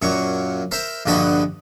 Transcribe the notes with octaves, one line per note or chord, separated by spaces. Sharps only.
F#2 A#2 F#3 C#6
A#4 C5 E5
A#1 G2 D3 F#4 B4 D#5